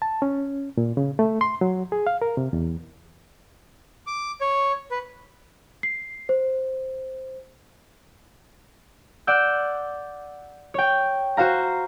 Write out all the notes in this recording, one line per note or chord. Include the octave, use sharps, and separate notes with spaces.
A5
C#4
A#2
C#3
A3
C6
F#3
G#4
F5
A#4
C3
E2
D6
C#5
B4
C7
C5
D5 F#5 E6 G6
C#5 G5
F#4 C5 F5 A#5